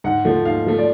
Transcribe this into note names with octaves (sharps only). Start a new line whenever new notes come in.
G#2 F#5
F3 A3
G#2 F5
F3 A3
D5